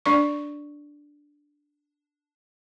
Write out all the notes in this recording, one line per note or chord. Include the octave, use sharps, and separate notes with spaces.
D4 D5 C#6